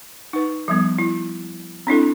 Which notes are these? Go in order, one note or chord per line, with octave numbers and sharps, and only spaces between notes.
D#4 B4
F3 G3 B3
E4
C4 D4 E4 A4